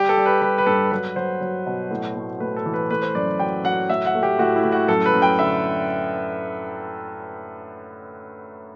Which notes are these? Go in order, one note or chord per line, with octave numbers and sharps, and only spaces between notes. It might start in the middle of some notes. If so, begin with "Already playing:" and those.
Already playing: G3 G4
A4
G3
B4
G3 B4
B4
G2 A4
F#3 B4
F#3 C5
F#3
B2
A2
A3
A2 B4
A4
E3
B4
A3 B4
C5
F#2 D5
F#3 G5
F#3 F#5
A2 E5
F#5
A3
G4
A2 F#4
E4
A2
F#4
F#2 A4
B4
F#2
G5
D3 E5